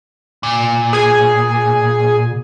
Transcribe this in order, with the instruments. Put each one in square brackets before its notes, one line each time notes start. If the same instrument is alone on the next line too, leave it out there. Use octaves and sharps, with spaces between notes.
[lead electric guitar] A#2
[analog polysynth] G#4 G#5